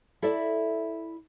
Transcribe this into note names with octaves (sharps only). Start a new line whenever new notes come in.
E4 A4 D5 E5